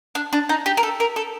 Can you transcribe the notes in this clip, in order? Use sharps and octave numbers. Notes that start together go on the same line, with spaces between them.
D4
D4
D#4
G4
A#4
A4
A#4
A4